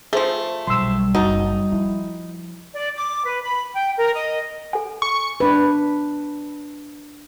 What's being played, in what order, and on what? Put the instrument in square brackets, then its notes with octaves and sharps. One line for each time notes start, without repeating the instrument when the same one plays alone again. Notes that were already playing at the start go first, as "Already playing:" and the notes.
[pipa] F3 A3 [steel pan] G#4 C5
[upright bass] B1 [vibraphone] G3 [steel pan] C6 E6
[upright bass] F#1 [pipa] D#4 [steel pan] F#4 A5
[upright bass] F3 [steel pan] E4
[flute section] D5
D6
B4
B5
G5
A#4
D#5
[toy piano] A4 G#5
[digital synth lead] C#6
[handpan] D4 B4